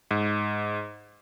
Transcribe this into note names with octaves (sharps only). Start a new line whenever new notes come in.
G#2